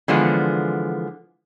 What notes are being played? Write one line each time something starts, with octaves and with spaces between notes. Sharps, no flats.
D3 E3 F3 G#3 B3